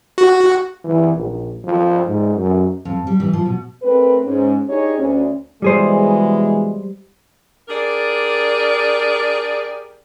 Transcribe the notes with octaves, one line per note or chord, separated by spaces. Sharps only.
F#4
E3
A#1
F3
G#2
F#2
F2
G3
E3
F3
B2
A3 C4 A#4 B4
G#2 C#4
D4 D#4 G4 G#4 C#5
D2 C#4
B2 E3 G3 G#3 G#4 C5
D4 G4 G#4 A#4 D5